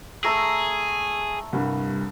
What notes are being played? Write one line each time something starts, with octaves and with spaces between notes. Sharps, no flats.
A3 G#4 A#5 E6
C2 G2